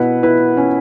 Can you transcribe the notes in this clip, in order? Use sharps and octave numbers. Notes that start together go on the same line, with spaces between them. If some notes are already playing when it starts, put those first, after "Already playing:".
Already playing: B2 E4 B4 F#5
E4 B4
C#4